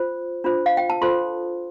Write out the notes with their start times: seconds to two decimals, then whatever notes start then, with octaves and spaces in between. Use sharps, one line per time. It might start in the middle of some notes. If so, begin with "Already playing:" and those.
Already playing: F4 C5
0.44 D4 F4 C5
0.66 F5
0.77 G5
0.90 A5
1.02 F4 A4 C5 C6